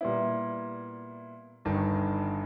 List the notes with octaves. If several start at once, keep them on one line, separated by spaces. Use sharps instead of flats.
A#2 G3 B3 E4
G1 G2 D#3